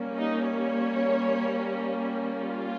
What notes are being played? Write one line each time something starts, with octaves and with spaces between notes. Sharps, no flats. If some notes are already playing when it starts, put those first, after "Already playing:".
Already playing: G3 A#3 C#4
D#4
C#5
F4